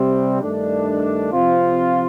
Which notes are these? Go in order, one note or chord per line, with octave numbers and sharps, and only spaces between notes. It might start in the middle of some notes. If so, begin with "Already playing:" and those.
Already playing: C3 G3 C4
G2 D#3 A3 D4
C3 F3 C4 F4